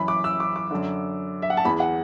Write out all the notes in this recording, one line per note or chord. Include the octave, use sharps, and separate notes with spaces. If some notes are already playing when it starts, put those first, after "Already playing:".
Already playing: F#2 E3 B5
D6
E6
D6
D6
F#2 D3
E5
F#5
A5
E2 E3 B5
F#5